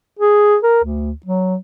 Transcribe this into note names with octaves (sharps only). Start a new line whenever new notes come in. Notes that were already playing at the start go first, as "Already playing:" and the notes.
G#4
A#4
D2
F#3